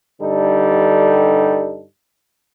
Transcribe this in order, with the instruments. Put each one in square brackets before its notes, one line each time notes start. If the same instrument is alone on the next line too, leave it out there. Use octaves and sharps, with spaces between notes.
[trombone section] G2 D3 G3 D#4 A4